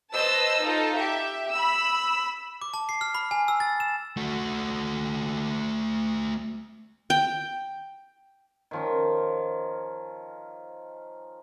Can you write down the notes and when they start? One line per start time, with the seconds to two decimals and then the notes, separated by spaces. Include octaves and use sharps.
0.13 B4 C5 D#5 A5 E6
0.62 D#4 F4 A4
0.96 G4 E5
1.51 B5 E6
2.62 D6
2.74 A5
2.89 C7
3.01 F6
3.15 B5
3.31 G#5
3.48 E6
3.60 A6
3.80 E7
4.17 A3 F#4
7.10 G5
8.71 D#3 F3 C#4